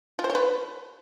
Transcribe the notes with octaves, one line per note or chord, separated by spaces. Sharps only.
F4
C5
C#5
B4